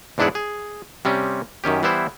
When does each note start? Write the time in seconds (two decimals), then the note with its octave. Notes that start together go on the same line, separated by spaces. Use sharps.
0.18 E2 G#2 D4 E4 G#4 F#5
0.35 G#4
1.05 C3 G3 C4 C#4
1.64 F#2 D#3 C#4 G4
1.83 E3 G3 B3 E4 C5